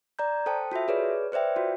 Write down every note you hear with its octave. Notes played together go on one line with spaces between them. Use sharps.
D5 A#5 G6
A4 C5 G5 A5
F4 F#4 A4 E5
G#4 B4 C#5 D5
B4 C5 D5 E5 G5
F4 F#4